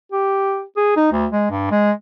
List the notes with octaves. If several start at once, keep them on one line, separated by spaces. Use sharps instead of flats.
G4
G#4
D#4
D2
G#3
G2
G#3